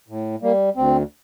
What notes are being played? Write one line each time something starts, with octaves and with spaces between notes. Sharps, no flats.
A2
G3 A#3
D2 C4